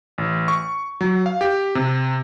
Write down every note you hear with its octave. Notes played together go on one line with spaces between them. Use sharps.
A1
C#6
F#3
F5
G4
C3